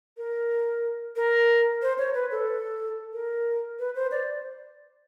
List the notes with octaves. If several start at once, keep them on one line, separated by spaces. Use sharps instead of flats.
A#4
A#4
C5
C#5
B4
A4
A#4
B4
C5
D5